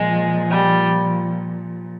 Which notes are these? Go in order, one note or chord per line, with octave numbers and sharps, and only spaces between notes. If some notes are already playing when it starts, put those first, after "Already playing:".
Already playing: A#2 F3 G#3
G3